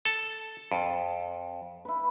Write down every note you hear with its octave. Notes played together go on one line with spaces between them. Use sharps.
A4 A5
F2
E4 B4